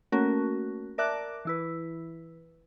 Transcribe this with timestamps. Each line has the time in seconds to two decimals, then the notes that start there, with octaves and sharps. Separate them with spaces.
0.12 A3 A#3 C#4 F#4 A#4
0.98 A#4 D5 E5 A5 D6 F#6
1.45 E3 E4 B4